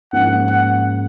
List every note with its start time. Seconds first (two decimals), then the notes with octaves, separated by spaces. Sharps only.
0.13 G#2 F3 A#3 C#4 F#5
0.50 F#5